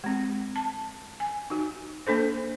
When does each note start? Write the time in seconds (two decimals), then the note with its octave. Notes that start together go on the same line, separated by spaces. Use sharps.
0.04 G#3 C4
0.56 A5
1.20 G#5
1.50 D#4 F#4
2.07 A#3 D4 A4 C5